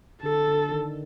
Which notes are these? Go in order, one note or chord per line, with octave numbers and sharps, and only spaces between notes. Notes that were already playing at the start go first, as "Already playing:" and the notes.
D3 A4
D3
D#3